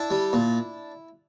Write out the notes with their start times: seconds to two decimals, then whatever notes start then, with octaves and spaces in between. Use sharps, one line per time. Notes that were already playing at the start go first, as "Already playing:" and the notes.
Already playing: D4 E4
0.10 G3
0.33 A#2